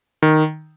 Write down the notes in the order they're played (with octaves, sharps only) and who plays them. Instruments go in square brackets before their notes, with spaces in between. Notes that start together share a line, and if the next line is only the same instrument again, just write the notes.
[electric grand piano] D#3